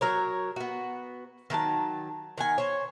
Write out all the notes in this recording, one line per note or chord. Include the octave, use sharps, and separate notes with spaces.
F#3 A#4 C#5
B3 F#4
D#3 F#3 F#4 A5
D#3 F#5 G#5
C5 C#5